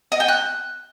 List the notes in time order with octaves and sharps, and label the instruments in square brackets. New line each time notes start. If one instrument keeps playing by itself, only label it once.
[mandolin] D#5
G5
F#6